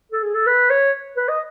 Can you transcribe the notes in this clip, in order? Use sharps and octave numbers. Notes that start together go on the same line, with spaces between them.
A4
G#4
A4
B4
C#5
B4
D#5